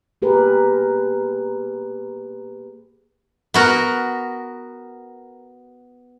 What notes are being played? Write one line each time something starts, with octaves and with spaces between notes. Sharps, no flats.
A#3 B3 G4 G#4 A#4 B4
B3 F#4 A#4